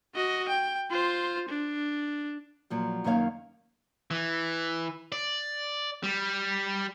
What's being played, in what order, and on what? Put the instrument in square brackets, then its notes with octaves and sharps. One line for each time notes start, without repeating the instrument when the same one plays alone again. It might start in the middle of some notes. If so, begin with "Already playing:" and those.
[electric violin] F#4 D#5
G5
F4 C5
D4
[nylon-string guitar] A#2 F3 F#3
F#2 D#3 A#3 C#5 F5
[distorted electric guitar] E3
D5
G3